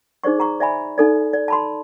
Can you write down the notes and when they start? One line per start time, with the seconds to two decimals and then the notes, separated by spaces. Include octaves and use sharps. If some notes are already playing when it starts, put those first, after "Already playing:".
0.24 D#4 G#4 C5 D5 C#6
0.38 G#4 A#5 C#6
0.60 D5 E5 G#5 B5
0.98 D#4 A4 D5
1.33 D5
1.48 A5 B5 C6